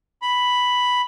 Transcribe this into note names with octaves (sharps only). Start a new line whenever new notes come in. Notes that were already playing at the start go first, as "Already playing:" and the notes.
B5